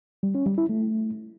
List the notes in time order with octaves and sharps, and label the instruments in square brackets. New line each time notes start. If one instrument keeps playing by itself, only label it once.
[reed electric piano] G3
C#4
G3
E4
A3